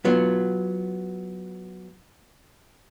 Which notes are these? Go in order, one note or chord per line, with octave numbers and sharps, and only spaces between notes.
F#3 B3 F4